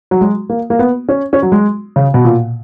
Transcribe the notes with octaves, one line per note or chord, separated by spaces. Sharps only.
F#3
G#3
A#3
A#3
B3
C#4
C#4
F#3
G#3
C#3
B2
A#2